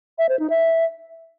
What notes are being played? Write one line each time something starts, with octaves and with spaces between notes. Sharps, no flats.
E5
C5
D#4
E5